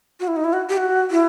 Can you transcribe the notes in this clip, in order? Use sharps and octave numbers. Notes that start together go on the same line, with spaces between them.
F#4
E4
D#4
E4
F#4
G4
F#4
E4